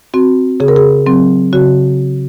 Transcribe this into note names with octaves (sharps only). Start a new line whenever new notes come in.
C4 F#4
C#3 G#4
A#4
G#4
F#3 C4
C#3 F#4